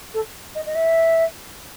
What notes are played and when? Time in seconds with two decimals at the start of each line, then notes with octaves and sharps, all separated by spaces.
0.14 A4
0.55 D#5
0.66 D#5
0.75 E5